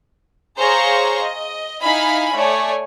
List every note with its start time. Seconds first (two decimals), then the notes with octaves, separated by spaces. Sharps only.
0.57 G#4 C5 C#5 F5 A#5 C#6
1.22 D#5
1.82 D#4 E4 F5 G#5 B5
2.34 A3 C#5 D5 G#5